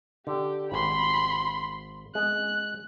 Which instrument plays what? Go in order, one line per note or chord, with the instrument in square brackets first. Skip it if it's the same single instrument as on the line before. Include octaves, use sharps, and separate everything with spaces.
[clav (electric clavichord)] D3 [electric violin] G4
[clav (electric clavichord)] G#1 [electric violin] B5 C6
[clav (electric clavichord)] G#3 [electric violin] F#6